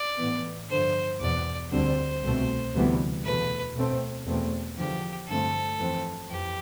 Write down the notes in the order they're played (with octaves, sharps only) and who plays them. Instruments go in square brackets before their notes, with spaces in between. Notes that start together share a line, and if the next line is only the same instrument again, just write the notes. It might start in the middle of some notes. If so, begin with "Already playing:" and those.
Already playing: [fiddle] D5
[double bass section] A2 E3 B3
[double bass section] G2 D3 F3 [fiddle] C5
[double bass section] E2 B2 B3 [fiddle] D5
[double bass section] D2 D3 G3 C4 [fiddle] C5
[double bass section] C2 B2 A3 C4
D2 C3 E3 G3 B3
[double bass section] E2 B2 A3 [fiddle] B4
[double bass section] B2 A3 C4
E2 B2 A3 C4
[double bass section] E2 D3 F3 [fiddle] G4
[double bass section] G2 D3 F3 A3 C4 [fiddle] A4
[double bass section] F2 E3 A3 C4
[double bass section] F2 E3 [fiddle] G4